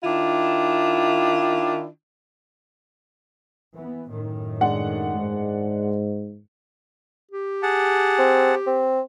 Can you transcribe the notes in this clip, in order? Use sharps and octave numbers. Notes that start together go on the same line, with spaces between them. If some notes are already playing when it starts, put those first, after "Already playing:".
D#3 D4 E4 F4
E3 B3
F#2 A2 D#3
G#3 D4 F#5
G#2
G4
G#4 F#5 A5
C4
C4